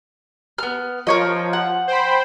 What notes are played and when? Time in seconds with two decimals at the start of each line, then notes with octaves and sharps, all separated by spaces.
0.58 B3 F6
1.07 F3 A#4 C#5 D#5
1.53 F#5
1.88 C5 G5 B5